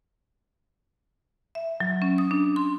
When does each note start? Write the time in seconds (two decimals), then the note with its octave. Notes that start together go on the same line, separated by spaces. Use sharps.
1.55 E5
1.80 F#3
2.02 C#4
2.18 D#6
2.31 D4
2.56 C6